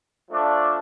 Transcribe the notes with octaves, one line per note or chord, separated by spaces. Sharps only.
F3 A3 D4 F4